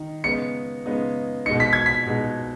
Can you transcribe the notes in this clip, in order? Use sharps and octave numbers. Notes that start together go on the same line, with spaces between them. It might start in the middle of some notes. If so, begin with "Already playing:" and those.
Already playing: D#3 D#4
C#3 G#3 B3 D#4 C#7
C#3 G#3 B3 D#4
B2 G#3 D#4 C#7
B6
G#6
B6
B2 G#3 D#4